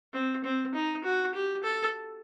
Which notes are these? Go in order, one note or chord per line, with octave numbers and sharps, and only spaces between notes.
C4
C4
D#4
F#4
G4
A4